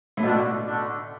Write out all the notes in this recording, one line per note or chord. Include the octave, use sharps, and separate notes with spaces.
A2
B2 D3 A3 D4
D3 A3 D4